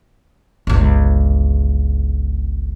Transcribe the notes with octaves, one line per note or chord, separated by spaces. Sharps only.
G1 C#2